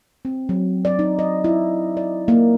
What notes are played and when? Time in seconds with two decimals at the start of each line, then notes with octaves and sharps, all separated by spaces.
0.25 C4
0.49 F#3
0.85 D5
0.99 D#4
1.19 D#5
1.44 E4
1.97 D5
2.28 A#3